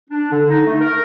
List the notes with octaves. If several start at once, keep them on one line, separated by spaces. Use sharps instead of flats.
D4
D3
D#4
A3
A#4